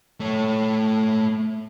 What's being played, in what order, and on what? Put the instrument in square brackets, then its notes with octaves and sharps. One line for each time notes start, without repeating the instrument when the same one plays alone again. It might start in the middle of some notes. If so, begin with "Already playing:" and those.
[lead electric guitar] A3 C#5